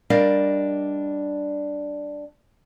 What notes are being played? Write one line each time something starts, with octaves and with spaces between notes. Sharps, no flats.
G3 D4 A#4 D#5 F5